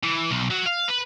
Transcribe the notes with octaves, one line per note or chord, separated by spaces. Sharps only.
E3
B1
F#3
F5
B4